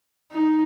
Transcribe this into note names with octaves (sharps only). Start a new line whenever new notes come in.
D#4